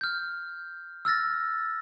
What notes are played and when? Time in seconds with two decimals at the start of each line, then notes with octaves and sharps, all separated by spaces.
0.01 F6 G6
1.05 E6 F6 A6 A#6